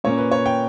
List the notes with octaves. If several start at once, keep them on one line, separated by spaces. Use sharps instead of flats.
A#2 A#3 C#4 C#5
B4
C#5
G5